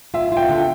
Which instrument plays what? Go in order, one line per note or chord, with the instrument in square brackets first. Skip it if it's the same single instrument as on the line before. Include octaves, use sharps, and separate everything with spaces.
[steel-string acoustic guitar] F4 [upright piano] E5
[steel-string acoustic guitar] F4 [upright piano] G5
[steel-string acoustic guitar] D3